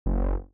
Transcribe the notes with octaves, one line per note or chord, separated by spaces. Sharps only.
F#1